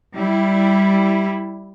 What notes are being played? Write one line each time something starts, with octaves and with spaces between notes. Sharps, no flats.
G3 E4